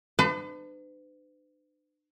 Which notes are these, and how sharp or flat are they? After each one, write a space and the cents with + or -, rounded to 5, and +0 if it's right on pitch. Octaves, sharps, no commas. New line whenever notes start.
D4 +45 B4 +45